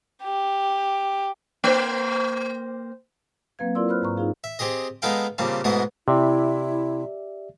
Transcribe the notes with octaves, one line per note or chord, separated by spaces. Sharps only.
G4
A#3 C5
F#3 A#3 C4 B4 F5 G#6
E4 F4 A#4 D5 C6 E6
B4 C5 B5 F6 F#6
G#2 A#5 C#6
D#4 F4 G#4 F5
E5
C4 G4 G#4 D#5
G#3 B3 D#4 A4 F5 G5
A#2 C#3 G3 C4 A5
G#2 B2 G#3 A3 E4 D#5
C3 E4 G4 D5 E5